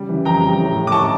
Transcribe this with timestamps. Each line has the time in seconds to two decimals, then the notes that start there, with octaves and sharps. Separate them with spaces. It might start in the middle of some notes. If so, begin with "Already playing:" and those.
Already playing: C#3 G3
0.09 E3
0.25 F2 G5 A#5
0.42 G3
0.59 A2
0.75 A2
0.87 D6
0.92 A2 A5 C#6